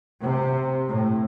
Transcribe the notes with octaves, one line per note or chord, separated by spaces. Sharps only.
C3
A2